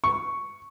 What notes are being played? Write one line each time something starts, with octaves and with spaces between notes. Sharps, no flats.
C#6